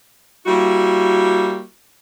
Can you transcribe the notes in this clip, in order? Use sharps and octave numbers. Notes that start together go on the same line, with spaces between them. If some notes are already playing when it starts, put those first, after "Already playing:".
G3 A#3 E4 F#4